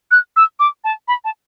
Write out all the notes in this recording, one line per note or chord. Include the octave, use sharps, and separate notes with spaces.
F#6
E6
D6
A5
B5
A5